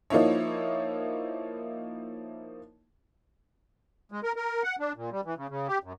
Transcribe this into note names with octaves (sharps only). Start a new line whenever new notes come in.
F3 A#3 D#4 E4 C#5
G#3
A#4
A#4
F#5
D4
A#2
G3
E3
C#3
C#3
G4
F#2